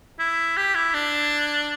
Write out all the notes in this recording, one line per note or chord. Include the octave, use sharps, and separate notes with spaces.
E4
G4
E4
D4